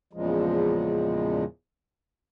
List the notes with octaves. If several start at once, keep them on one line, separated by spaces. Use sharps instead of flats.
E2 A#2 C#3 F3 G#3